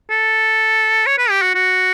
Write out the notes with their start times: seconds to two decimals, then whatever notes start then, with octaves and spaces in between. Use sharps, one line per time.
0.10 A4
1.07 C#5
1.18 B4
1.30 G4
1.42 F#4
1.55 F#4